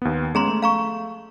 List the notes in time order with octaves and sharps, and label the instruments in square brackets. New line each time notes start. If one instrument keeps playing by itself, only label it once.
[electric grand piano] D#2 B3
[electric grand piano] G#3 B3 C#4 [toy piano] G#4 A#5 C6
[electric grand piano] A3
[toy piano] F5 A#5 C#6